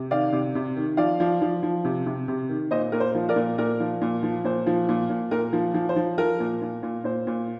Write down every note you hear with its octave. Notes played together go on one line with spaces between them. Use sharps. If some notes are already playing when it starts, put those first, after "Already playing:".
Already playing: C3
D#3 D5 F5
C3
C3
D#3
F3 D5 F5
F3
F3
F3
C3
C3
C3
D#3
A#2 C5 D#5
A#2 A#4
C5
F3
A#4 D5
A#2
A#2 A#4 D5
F3
A#2
F3
A#2 C5
F3
A#2
A#2
A#2 A#4
F3
F3
C5
F3
F3 A#4
A#2
A#2
A#2
A#2 C5
A#2